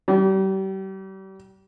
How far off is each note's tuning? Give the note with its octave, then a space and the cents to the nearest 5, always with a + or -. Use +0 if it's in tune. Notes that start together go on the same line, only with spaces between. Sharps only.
G3 -35